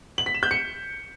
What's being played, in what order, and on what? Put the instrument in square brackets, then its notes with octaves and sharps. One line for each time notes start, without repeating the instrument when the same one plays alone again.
[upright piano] F#7
B6
E7
G6
C#7